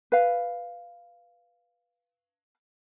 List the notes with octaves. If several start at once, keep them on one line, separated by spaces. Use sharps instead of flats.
B4 F5